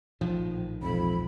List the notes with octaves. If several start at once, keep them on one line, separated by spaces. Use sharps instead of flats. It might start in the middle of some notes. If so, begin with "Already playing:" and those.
A#1 A2 D#3 F3
E1 F2 B5